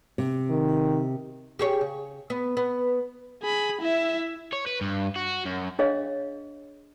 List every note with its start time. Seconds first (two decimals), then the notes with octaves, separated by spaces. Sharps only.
0.18 C3
0.50 D#3
1.59 G4 G#4 C#5
1.81 C#3
2.30 B3
2.57 B3
3.42 G#4 B5
3.81 E4 E5
4.53 C#5
4.66 B4
4.81 G2
5.16 F#4
5.46 F#2
5.79 D4 G#4 C#5 D#5 F5